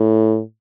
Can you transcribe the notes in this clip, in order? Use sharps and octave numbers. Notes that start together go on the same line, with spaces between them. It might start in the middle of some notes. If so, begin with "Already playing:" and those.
Already playing: A2